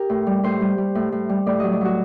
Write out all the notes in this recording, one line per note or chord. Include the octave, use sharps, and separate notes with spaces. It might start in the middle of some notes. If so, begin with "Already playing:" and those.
Already playing: G4 A#4
A2
G3
A2 C5
G3
G3
A2
A2
G3
A2 D5
F#3 D#5
D5
F#3 F#4